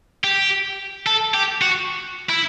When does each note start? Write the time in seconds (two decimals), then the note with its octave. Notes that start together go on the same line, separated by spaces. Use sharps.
0.24 G4
1.07 A4
1.34 G4
1.62 F#4
2.30 E4